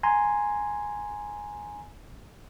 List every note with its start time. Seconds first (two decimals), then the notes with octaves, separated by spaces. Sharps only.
0.03 G#5 A#5 C6